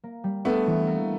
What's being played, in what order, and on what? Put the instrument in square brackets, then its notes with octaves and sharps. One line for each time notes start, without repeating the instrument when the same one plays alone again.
[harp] A#3
G3
[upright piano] A3 B3 [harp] D4
[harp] E3
A#3